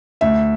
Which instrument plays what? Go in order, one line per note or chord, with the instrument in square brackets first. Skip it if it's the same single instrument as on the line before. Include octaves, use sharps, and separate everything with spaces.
[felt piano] D2 E5